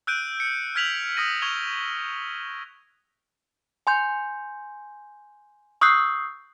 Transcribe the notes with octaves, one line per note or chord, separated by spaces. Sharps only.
E6 F#6 G6 D7 D#7
C#7
F6 G#6 B6 F7 F#7
D#6 E6 A#6 D#7
C#6 G#6 F7 G7
G#5 C6 G6
C#6 D#6 E6 F#6 G6 C7